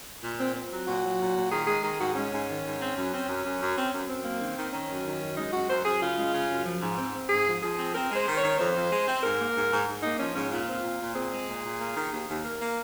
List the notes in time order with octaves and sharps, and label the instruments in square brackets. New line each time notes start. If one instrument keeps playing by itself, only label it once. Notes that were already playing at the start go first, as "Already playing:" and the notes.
[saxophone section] A#2
C4
C4
F#3
A#2 F#4
F#3
A#2
A#2
D#3 G#4
G#3 G#4
D#3 G#4
G#2 F#4
G#3 C#4
G#2
D#3
G#2
C4
F#2
C4
F#2
F#2
F#2
C4
F#2
F#2 C4
A#3
D#3
D#3
D#3 C#4
F#2
D#3
F#2
G#3 D#4
F#2 F#4
F#2 C5
F#2 G#4
C#3 F4
G#3
C#3
F#2
F3
G#2
C4
C4
G#2 G#4
F3
F3 G#4
C4
C4 A#4
G#3
C5
D#3
C#5
D#3
F2 C5
F2
G#3
C4
G#2 A#4
A#3
G#2
G#2
G#2
A#3 D#4
F3 C#4
G#2 C#4
A#2 F4
C4
A#2
A#2
C4 G#4
G#3
A#2
A#2
A#3
D#3
D#2
D#2
A#3 A#4
A#3